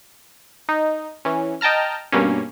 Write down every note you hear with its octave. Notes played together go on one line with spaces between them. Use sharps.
D#4
E3 C#4
D#5 G5 A5 A#5 F6
G2 B2 A#3 C#4